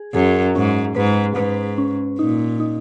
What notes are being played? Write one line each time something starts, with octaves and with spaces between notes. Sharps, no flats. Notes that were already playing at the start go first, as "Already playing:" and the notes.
Already playing: G#4
F#2 G#4
G#2 C#4
G#2 B4
G#2 B4
C#4
A#2 D#4
D#4